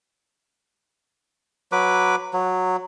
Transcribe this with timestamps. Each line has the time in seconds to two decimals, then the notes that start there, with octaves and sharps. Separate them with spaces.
1.72 F#3 B4 D6
2.33 F#3